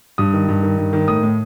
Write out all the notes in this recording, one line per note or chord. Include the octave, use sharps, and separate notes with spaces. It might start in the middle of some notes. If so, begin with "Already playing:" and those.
G2 D#6
D#3
G2
D#3
G2
D#3
A2 D#6
A2